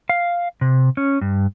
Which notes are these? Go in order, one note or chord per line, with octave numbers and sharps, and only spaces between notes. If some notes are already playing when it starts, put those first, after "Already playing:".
F5
C3
C#4
G2